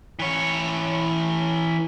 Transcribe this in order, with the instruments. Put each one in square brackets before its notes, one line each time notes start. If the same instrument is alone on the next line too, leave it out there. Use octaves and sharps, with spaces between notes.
[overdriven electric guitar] E3 C#5